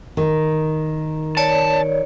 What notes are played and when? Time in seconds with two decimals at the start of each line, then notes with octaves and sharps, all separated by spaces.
0.17 D#3
1.37 C#5 D5 A5